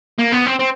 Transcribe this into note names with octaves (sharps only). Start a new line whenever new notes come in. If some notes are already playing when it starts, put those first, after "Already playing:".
A#3
B3
C4
C4